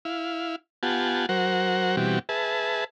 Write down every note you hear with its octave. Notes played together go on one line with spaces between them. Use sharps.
E4 F5
B3 F4 G4 F#5 G#5 A5
F#3 F#4 A#4 C5 F#5
B2 E3 G3 C4 F#4 G4
G#4 B4 E5 A5